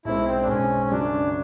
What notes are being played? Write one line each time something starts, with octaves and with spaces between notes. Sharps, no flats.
B1 B2 G#3 C4 E4
C4
D4
B1 B2 G#3 C4 C#4
C#4
F#2 C#3 F#3 D4